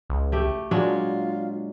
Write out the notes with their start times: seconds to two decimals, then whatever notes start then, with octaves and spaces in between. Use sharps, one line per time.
0.10 C#2
0.32 A3 G4
0.71 A#2 F#3 G#3 D4 F4